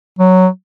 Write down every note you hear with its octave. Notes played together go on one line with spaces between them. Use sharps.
F#3